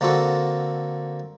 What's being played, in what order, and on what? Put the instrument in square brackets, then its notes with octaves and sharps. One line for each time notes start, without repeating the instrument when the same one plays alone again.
[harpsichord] D3 A#3 C4 F#4 A4